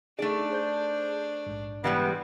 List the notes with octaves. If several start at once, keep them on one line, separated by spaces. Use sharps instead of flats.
A3 D4 D#4 G#4 D5
G#4 C5 G6
A#1 G#2
E3 G3 G#3 B3